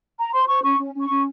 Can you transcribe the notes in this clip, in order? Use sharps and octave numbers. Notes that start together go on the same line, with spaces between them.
A#5
C5 C6
C5 C#6
C#4 C#6
C#4
C#4
C#6
C#4